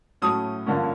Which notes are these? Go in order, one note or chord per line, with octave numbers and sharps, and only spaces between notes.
A2 F#3 A3 C#4 D#6
G2 D3 F3 A#3 C#4